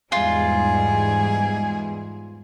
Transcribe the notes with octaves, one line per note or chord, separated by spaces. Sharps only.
E2 G#2 G3 F4 G#4